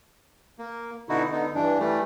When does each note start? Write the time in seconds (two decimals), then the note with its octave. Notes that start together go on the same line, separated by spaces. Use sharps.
0.59 A#3
1.09 B2 D3 D#4 E4 F#4
1.32 D3 B3 D#4
1.55 G2 E3 D4
1.79 E3 G3 A3